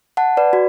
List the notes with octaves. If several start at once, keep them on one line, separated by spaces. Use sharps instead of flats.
F#5 A5
B4 D5
F#4